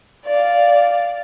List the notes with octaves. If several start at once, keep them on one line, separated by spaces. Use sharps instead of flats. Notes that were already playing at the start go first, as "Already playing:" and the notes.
D5 F5